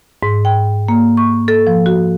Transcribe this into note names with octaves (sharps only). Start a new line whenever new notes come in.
G#2
G5
A#3
C#6
A4
F3
F#4